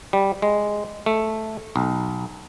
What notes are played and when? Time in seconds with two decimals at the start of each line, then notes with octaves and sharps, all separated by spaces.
0.13 G3
0.42 G#3
1.06 A3
1.76 B1